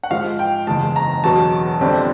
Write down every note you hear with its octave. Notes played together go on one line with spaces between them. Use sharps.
F#5
G#2 F3 G#3 F5
G5
F#1 E2 C#3 E3 G#3 A5
A#5
E1 E2 B2 F#3 B3 A5
G1 F2 D3 G3 C4